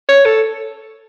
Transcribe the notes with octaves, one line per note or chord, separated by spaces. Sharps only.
C#5
A4